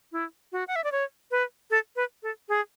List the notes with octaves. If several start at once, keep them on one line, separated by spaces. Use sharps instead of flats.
E4
F#4
F#5
E5
D5
C#5
B4
A4
B4
A4
G#4